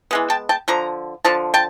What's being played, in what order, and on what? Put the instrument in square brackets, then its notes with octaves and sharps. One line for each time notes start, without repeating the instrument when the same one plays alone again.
[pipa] E3 G#3 B3
G5 A5
G5 A5
D3 F3 A#5
D3 F3 A5
G5 A5